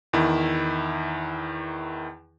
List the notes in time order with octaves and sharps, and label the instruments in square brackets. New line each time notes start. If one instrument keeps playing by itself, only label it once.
[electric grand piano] E2 D#3 E4